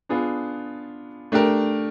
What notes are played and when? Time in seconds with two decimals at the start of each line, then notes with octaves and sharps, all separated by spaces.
0.09 B3 D4 F4 G#4
1.32 A3 D4 G4 A#4